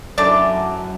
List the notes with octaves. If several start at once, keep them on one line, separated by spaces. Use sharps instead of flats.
F#2 A3 D4 E4 D5 G#5 A5